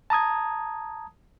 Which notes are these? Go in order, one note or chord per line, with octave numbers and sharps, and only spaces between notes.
A5 A#5 D#6 G#6